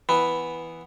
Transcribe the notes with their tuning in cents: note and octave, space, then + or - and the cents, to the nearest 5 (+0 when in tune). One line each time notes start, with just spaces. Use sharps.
E3 +0 B3 +0